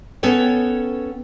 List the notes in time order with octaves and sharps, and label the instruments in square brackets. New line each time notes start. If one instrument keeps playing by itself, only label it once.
[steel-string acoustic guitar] B3 C#4 A4 C#5 G5